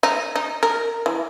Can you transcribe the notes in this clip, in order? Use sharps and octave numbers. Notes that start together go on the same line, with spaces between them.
D#4
D#4
A#4
E3